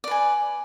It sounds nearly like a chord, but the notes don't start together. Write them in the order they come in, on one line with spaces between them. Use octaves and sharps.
D5 B4 G#5